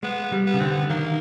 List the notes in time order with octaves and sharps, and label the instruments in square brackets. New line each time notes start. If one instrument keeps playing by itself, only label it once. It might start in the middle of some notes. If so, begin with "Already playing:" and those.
[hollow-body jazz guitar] G#3 [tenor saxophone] B3
[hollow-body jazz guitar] G3
[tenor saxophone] B3
[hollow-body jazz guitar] C#3
[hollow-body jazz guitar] D3 [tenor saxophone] C4
[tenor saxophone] B3
[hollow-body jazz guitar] D#3 [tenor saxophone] A#3